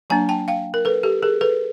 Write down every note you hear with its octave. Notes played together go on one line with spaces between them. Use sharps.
F#3 A#3 D4 G#5 A#5
G5 A5
F5 G5
A#4
A4 B4
G4 A4
G#4 A#4
A4 B4